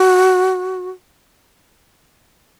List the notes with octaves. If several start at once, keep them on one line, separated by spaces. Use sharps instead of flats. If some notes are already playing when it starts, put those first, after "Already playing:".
Already playing: F#4